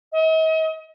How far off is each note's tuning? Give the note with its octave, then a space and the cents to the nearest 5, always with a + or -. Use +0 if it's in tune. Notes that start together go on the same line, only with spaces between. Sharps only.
D#5 +45